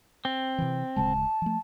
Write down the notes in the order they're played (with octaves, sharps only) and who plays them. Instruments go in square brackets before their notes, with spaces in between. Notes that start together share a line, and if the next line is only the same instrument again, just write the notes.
[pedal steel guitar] C4
[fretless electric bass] C3 E3
[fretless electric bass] D1 C#3 G#3 [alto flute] A5
[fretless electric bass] F3 A3